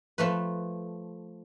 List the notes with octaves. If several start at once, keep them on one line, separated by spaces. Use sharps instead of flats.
F3 A3 B4